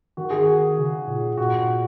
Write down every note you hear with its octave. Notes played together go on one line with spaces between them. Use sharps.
D#3 F#4
G#4
F#4
C#3
A#2
A#2 F#4
F#4